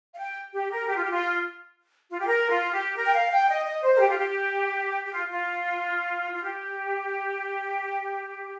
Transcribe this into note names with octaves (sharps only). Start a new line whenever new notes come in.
F5
G5
G4
A#4
G4
F4
G4
F4
F4
G4
A#4
F4
G4
A#4
G5
F5
G5
D#5
D#5
C5
A#4
G4
F4
G4
G4
F4
F4
F4
G4